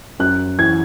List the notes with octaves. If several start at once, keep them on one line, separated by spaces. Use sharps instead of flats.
F#2 F#6
E3 G#6